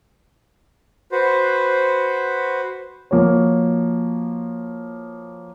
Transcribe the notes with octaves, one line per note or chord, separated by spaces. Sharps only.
F#4 B4 C5
F3 A#3 F#4 C#5